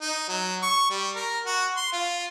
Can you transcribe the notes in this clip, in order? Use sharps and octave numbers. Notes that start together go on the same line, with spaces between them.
D#4
F#3
C#6
G3
A#4
F#4
C6
F4